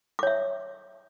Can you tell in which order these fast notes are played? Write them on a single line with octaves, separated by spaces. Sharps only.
D6 C#5 E5